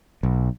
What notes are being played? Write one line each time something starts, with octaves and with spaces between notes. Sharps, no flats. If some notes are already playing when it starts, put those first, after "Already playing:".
B1